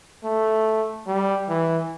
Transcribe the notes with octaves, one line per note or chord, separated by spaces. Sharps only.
A3
G3
E3